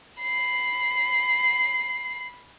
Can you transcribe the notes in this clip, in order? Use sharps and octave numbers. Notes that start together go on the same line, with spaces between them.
B5 C7